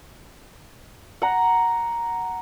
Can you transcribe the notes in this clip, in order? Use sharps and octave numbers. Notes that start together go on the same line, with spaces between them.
F#5 A#5